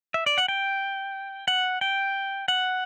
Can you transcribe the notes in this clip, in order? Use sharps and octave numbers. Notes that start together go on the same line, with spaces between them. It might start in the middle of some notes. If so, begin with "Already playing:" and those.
E5
D5
F#5
G5
F#5
G5
F#5